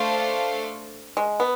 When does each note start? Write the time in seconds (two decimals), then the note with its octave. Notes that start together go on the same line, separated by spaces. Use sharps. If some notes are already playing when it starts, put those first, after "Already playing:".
Already playing: A3 D4 A4 C5 F5
1.17 G#3
1.40 B3